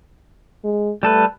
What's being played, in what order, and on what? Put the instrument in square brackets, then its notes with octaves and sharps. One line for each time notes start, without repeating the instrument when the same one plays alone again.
[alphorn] G#3
[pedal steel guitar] G3 A4 B4 [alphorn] A3